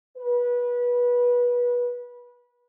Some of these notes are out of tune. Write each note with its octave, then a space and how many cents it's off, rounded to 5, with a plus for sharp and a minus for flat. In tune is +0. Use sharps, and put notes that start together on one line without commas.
B4 -25